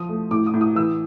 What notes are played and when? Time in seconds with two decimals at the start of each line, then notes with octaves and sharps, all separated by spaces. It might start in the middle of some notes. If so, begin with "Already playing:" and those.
Already playing: F3 D#6
0.09 A3
0.31 A2 D6
0.46 D#6
0.54 A2
0.61 D#6
0.76 E3 E6